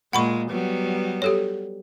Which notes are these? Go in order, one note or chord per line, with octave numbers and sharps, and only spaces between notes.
A#2 G#3 F#5 B5 C#6
F#3 G3 B3
G4 A4 C#5